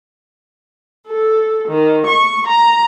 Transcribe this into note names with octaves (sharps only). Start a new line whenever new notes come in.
A4
D#3
C#6
A#5